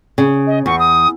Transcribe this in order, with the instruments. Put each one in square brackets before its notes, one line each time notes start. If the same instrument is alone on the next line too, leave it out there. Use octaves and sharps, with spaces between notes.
[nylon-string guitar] C#3
[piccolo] D#5
[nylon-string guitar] E2 [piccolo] C#6
[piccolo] D#6